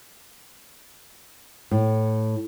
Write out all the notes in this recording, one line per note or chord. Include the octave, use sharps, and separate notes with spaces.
A2